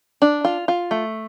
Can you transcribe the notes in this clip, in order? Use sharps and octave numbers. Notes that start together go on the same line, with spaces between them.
D4
F4
F4
A3